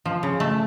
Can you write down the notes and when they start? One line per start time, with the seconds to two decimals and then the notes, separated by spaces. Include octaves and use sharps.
0.05 F3
0.23 C#3
0.40 A3